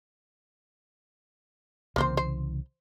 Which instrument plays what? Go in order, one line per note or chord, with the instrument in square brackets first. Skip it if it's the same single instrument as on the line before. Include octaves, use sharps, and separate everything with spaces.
[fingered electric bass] C2 C#3 E3 [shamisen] A#3 C4 C5
[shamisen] C5